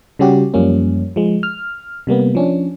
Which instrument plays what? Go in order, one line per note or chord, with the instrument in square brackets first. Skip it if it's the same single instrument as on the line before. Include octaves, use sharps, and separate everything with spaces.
[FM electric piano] C#3 G3 C#4 F#4 G4
F#2 F3 G3 A#3 C#4
F3 G#3
F6
C3 G3 A#3 B3
F3 C#4 D4